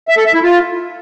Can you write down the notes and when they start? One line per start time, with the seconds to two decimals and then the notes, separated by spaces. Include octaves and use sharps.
0.08 E5
0.17 A4
0.25 E5
0.34 E4
0.43 F4